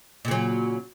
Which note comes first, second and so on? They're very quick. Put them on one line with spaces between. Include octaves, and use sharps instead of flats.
A#2 C#3 F#3